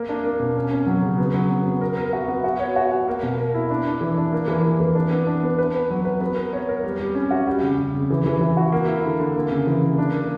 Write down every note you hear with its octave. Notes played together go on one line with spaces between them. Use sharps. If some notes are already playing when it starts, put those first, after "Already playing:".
Already playing: A#3
D4
A#3
B2
C#4
C#4
F#3
C#3
B3
F#3
B3
B3
A#4
A#4
F#4
B3
F#4
C#5
F#4
F#4
A#3
B2
A#4
E4
D4
D4
E3
D4
A#3
E3
A#3
E3
D4
B3
D4
B3
B4
B4
F#3
B4
B3
A#4
C#5
A#4
G3
G3
C#4
F#4
G3
C#3
C#3
C#3
E3
E3
E3
F#4
A#3
E4
D3
D3
A#3
C#3
E3
A#3
D4
A#3